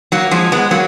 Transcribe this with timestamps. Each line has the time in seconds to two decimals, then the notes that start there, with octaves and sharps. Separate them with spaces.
0.12 F#3 A#3
0.31 F3 G#3
0.52 G#3 B3
0.71 F#3 A#3